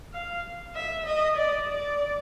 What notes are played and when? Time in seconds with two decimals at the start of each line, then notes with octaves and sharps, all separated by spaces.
0.13 F5
0.75 E5
1.06 D#5
1.37 D5
1.68 D5